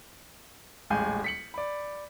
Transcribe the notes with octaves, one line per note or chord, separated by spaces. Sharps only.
D#1 A1 G#3 F5 G#5 G6
B6 C#7 F#7
D5 B5